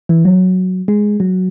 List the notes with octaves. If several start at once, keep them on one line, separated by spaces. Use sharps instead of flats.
E3
F#3
G#3
F#3